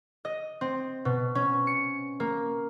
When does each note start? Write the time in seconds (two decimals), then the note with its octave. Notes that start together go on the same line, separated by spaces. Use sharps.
0.25 D#5
0.61 C4
1.05 B2
1.35 C#4
1.67 C#7
2.20 A#3